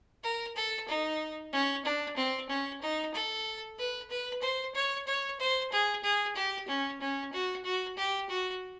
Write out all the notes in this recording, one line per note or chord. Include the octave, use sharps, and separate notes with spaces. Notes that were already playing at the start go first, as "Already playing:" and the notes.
A#4
A4
D#4
C#4
D4
C4
C#4
D#4
A4
B4
B4
C5
C#5
C#5
C5
G#4
G#4
G4
C#4
C#4
F#4
F#4
G4
F#4